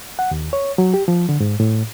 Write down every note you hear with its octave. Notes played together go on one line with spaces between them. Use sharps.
F#5
D#2
C#5
F#3
G4
F3
D3
G#2
A2